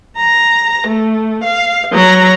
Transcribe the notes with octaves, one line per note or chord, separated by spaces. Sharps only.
A#5
A3
F5
F#3 A#5